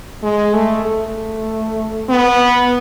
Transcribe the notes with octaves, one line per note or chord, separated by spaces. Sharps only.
G#3
A3
A3
B3